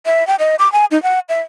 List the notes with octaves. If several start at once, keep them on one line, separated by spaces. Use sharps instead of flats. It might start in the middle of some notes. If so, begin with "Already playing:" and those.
E5
G5
D#5
D6
G#5
D#4
F#5
E5